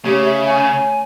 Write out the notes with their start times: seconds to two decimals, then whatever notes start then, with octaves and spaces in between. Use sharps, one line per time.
0.05 C#3 A3 G4 C#5
0.25 E5
0.46 G#5